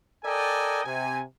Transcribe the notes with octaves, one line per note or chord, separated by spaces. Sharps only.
A4 A#4 D5 D#5 G5 G#5
C3 G#5